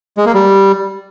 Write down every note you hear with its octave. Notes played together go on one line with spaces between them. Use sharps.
G#3
A#3
G3